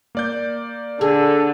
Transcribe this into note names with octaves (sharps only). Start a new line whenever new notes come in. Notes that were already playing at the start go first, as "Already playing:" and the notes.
A#3 D5 G6
D3 G#4 A4